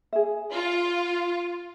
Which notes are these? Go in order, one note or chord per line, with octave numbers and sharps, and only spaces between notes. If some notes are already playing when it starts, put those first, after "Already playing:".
G#4 E5
F4